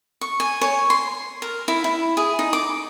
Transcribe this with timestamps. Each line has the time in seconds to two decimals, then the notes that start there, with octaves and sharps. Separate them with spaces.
0.21 C#6
0.40 G#5
0.61 C#5
0.90 C6
1.42 A#4
1.68 E4
1.84 E4
2.17 G#4
2.39 D#4
2.53 D6